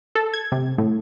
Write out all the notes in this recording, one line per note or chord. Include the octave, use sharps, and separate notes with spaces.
A4
G#6
C3
A2